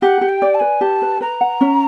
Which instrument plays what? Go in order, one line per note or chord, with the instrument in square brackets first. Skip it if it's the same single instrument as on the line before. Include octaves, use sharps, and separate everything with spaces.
[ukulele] G4 [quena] F#5
[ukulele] G4
[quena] G5
[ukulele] D5
[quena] A5
[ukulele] B4 [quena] G#5
[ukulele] G4 [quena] A5
[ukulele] B4
[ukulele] B4 [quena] A#5
[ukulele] F#5
C#4